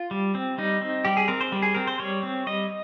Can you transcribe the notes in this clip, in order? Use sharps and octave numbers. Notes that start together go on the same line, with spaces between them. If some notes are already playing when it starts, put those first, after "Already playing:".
Already playing: F4
G3
C4
G3 D#4
C4
G3 G4
G#4
C4 A#4
C5
G3
G#4
C4 A#4
C5
G3 C#5
C4
G3 D#5